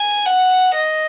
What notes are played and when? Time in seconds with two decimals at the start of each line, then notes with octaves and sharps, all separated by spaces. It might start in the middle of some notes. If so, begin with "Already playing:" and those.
Already playing: G#5
0.25 F#5
0.75 D#5